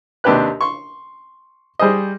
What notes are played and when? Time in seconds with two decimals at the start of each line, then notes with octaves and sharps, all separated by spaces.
0.24 D#2 C3 D4 G4 B4 F#6
0.61 C6 C#6
1.79 G3 G#4 C5 D#5